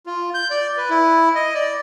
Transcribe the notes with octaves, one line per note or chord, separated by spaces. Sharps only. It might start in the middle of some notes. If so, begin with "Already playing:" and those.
F4
G6
D5
B4
E4
D#5
D5